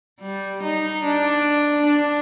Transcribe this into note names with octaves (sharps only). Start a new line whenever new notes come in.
G3
D#4
D4
D4